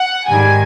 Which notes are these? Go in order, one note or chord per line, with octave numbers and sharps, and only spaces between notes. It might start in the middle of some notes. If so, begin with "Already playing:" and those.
Already playing: F#5
G#2 D#3 G3 G#5